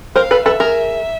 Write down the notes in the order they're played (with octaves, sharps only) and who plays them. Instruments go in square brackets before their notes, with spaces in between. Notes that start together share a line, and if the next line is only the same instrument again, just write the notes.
[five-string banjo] A#4 C5 [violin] F5
[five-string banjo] A4 B4
[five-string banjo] A4 B4 [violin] E5
[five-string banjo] G#4 A#4